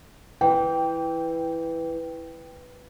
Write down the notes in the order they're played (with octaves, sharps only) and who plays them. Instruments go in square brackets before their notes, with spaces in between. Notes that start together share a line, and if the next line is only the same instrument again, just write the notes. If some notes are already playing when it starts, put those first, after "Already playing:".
[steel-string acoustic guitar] E3 [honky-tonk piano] G5